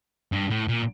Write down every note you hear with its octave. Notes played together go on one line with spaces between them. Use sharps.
G2
A2
A#2